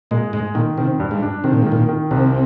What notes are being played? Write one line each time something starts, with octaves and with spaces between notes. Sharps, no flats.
A#2 G#3
G#2 G#3
A#2 D#3
C3 D#3
G2
G#2
D4
C3 D#3
A#2
G#2 D#3
A#2
D#3
C2 C3